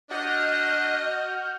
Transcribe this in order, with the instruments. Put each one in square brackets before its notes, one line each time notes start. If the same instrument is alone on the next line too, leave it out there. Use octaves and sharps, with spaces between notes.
[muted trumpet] D4 [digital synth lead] F#4 [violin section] D#5 [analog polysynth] F6 G6